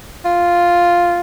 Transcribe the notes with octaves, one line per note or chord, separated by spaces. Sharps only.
F4